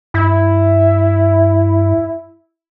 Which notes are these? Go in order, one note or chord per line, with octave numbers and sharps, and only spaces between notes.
G2 E4